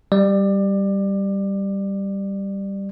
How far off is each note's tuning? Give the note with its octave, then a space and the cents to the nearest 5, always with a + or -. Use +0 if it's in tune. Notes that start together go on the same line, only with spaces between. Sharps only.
G3 +0 D5 +25